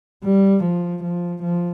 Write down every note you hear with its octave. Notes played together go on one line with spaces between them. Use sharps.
G3
F3
F3
F3